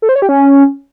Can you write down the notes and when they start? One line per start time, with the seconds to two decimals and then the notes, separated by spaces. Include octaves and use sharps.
0.02 A4
0.09 C5
0.16 C#5
0.22 G4
0.29 C#4